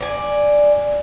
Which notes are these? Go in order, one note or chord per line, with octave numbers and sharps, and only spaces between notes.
D5 G#5